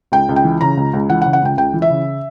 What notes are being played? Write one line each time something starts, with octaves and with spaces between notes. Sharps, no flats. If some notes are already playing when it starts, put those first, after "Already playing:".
C#2 G5
C#2
G5
E3
C#3 A#5
C#2
C#2
E3 F#5
F#5
C#3
F#5
C#2 G5
C#2 G5
E3
E5
C#3